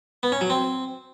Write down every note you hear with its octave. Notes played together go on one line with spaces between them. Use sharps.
B3
C#4
F#3
C4